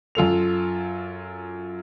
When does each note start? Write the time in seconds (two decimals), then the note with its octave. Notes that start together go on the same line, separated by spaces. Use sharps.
0.15 F#2 F4 A4 F7